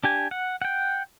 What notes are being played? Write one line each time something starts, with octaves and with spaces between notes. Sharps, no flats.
D4 G4 G#5
F#5
F#5 G5